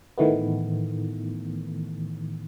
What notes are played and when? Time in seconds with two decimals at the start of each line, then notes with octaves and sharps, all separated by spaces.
0.18 A2 D#3 E3 A3 B3